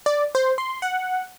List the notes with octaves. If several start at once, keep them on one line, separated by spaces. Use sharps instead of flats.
D5
C5
C6
F#5